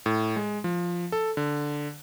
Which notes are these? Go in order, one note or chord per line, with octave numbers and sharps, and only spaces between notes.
A2
G#3
F3
A4
D3